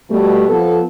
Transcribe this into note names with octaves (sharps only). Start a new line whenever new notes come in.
B2 G3 A3
F3 B3 A4